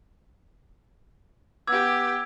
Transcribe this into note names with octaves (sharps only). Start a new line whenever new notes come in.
B3 G4 D6 E6 G#6